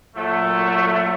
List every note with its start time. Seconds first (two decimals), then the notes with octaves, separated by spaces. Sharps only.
0.16 A#2 F#3 A3